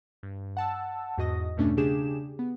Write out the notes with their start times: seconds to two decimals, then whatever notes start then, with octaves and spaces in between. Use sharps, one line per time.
0.23 G2
0.57 F#5 A5 E6
1.18 E2 G#2 F#4 D#5 D#6 A#6
1.57 E2 G2 B2 A3 C#4 D4
1.77 C#3 D4 G4 G#4 E7
2.39 B3